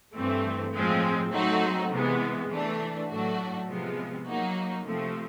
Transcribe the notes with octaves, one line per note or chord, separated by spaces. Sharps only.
G2 E3 A3 C4
A2 F3 G#3 C4
F#3 A3 C4 D#4 F#4
C3 E3 G#3 B3
E3 A3 D4
A2 F#3 A3 D4 F#4
C3 F3 G#3 B3
F#3 A#3 D#4 F#4
C3 F3 A3 C4